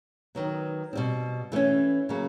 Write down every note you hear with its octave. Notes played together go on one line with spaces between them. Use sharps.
D#3 F#3 B3
B2 G3 C4
E3 A3 C#4
C#3 F#3 A#3